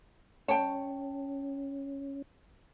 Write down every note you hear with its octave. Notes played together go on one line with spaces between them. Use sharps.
C#4 C#5 G5 A5